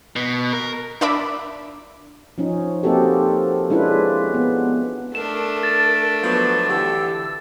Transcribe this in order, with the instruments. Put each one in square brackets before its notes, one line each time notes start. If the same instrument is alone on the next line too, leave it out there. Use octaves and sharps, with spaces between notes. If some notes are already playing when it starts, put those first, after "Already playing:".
[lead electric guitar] B2
A#4
[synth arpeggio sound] D4 A#4 E5 B5 D6
[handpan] F3 C#4 D#4
A#3 C4 D#4 F#4 G4 A4
G#3 C#4 D4 E4 F4 B4
B3
[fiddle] A3 D4 [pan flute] A#4 [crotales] E7
[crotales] A6
[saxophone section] F3 F#3 B3
[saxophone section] D3 E3 G4 [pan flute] E6